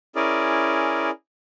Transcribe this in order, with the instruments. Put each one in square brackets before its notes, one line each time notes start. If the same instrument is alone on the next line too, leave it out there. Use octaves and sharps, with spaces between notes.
[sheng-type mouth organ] C#4 E4 G#4 A#4 D5